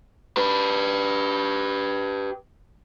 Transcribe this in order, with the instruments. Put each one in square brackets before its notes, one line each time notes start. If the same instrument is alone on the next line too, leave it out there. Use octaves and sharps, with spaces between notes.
[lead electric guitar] G4 B4